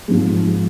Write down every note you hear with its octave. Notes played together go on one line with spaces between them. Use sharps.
G#2 F3 G#3